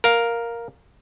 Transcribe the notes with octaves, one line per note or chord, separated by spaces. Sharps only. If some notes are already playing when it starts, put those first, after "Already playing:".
A#4 F5